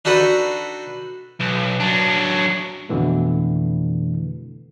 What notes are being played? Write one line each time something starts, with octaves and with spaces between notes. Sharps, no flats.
D4 D#4 F#4 A4 B4
B1
F#3 D4
F2 B2 D3 E3 A3